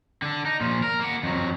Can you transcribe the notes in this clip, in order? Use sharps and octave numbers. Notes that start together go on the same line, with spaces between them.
D3 D4
D#4
A#2 F3
A#4
A#3 F#5
F2 F#3